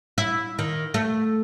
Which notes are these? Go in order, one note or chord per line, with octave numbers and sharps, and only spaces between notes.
E4
D#3
A3